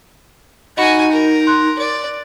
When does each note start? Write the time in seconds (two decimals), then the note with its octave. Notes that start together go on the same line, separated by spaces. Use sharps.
0.77 D#4 F#4 D#5 G#5 B5
1.12 A#4
1.47 C6 F#6
1.78 D5